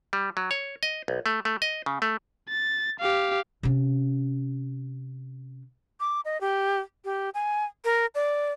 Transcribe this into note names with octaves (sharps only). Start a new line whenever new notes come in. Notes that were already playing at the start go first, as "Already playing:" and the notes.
G3
F#3
C#5
D#5
B1
A3
A3
D#5
C#3
A3
A6
G4 F5
C3 C#4
D6
D#5
G4
G4
G#5
A#4
D5